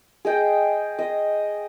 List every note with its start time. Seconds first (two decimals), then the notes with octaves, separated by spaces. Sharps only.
0.25 G#4 D#5 G5
0.99 D#5